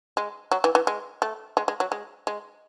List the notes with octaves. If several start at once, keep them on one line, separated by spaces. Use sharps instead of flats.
G#3
F#3
E3
E3
G#3
A3
G#3
G#3
F#3
G#3
G#3